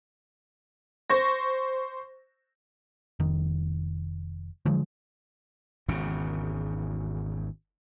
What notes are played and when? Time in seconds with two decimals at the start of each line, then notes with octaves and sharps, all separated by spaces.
1.10 C5 C#6 A#6
3.20 F1 D#3
4.65 D3 F3 F#3 G#3
5.88 G#1 E2 C#3